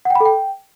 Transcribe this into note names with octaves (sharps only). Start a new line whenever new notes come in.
F#5
G5
B5
A4
G5